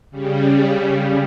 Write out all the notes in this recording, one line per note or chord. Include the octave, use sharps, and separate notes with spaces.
C#3 G3